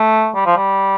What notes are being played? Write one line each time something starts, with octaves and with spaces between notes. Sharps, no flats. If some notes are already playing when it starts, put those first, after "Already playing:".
Already playing: A3
G3
F3
G3